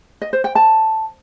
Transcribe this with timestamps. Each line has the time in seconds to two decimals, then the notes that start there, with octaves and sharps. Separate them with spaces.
0.22 D#5
0.33 C5
0.44 G5
0.55 A5